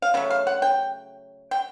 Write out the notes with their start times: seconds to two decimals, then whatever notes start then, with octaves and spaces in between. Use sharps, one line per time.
0.02 F5
0.14 C#3 F#3 A3
0.30 F5
0.47 F#5
0.62 G5
1.51 G5